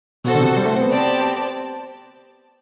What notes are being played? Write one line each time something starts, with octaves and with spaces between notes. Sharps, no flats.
B2 F#4 A4 C5
D3
C3
G3
A3
C4
B3
C4 G4 D5 A5